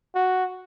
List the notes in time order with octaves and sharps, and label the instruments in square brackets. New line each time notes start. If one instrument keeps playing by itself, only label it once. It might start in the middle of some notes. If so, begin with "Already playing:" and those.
[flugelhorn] F#4